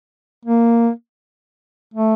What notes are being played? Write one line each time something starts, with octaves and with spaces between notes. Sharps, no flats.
A#3
A3